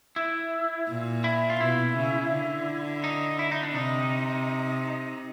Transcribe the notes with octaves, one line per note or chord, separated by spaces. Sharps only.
E4
A#2
E4
F4
B2 E4
C#3
D3
D#4
E4
D#4
D4
C3 D#4